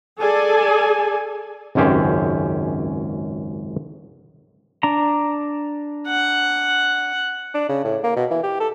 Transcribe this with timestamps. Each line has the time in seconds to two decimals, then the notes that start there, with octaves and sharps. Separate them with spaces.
0.20 G#4 A4 D5 G#5
1.75 G#1 C#2 F#2 C#4 G4 C5
4.83 D4 A#5
6.08 F#5
7.54 D4
7.69 C#3
7.85 A2
8.03 A#3
8.16 B2
8.30 E3
8.43 G4
8.60 A4